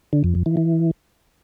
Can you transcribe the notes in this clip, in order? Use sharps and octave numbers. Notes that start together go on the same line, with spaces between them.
D3
F2
F2
E3
E3